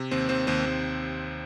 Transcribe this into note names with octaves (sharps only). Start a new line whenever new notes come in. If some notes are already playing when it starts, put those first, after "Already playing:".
Already playing: C3
D#2 C4 C5
D#2 C4 C5
D#2 C4 C5
D#2